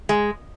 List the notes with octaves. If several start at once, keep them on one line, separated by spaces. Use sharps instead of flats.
G#3